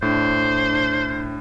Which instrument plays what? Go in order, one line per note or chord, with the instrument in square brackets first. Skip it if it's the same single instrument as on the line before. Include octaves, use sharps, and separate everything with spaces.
[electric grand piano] A2 [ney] D4 [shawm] C5